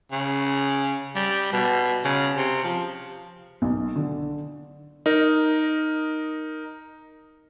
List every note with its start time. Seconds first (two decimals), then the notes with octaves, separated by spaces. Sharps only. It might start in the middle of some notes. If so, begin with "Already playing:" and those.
0.11 C#3
1.15 G3
1.53 B2
2.04 C#3
2.36 C3
2.64 F3
3.62 B1
3.96 D3
5.06 D#4 A#4